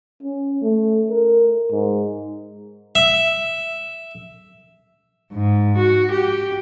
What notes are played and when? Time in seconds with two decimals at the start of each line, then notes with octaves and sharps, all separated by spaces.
0.23 C#4
0.62 A3
1.10 A#4
1.71 G#2
2.95 E5
5.33 G#2
5.78 F#4
6.11 G4